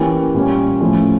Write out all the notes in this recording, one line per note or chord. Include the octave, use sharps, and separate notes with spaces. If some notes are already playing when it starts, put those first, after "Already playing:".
Already playing: E3 A#3 C#4 G4
A#2 G3 C#4
A2 F3 C#4